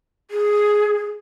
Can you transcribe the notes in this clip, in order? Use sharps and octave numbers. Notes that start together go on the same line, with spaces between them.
G#4